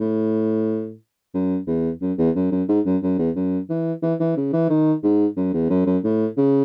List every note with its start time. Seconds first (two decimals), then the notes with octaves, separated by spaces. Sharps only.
0.01 A2
1.35 F#2
1.68 E2
2.01 F#2
2.19 E2
2.36 F#2
2.52 F#2
2.69 G#2
2.86 F#2
3.03 F#2
3.19 E2
3.36 F#2
3.70 E3
4.03 E3
4.20 E3
4.37 C#3
4.53 E3
4.70 D#3
5.03 G#2
5.37 F#2
5.54 E2
5.70 F#2
5.87 F#2
6.04 A2
6.37 C#3